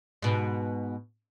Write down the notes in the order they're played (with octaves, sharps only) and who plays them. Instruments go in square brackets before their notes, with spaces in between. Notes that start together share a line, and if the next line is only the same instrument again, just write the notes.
[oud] G#2 B2